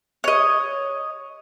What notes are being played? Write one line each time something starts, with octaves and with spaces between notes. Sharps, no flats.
C#5 D#5